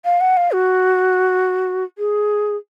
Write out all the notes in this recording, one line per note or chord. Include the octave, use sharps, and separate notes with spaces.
F5
F#5
F5
F#4
G#4